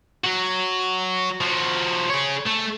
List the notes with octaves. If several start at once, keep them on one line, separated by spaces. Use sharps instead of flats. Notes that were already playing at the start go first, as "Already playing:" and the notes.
F#3 F#4
F3 F#4
G#4 C#5
A3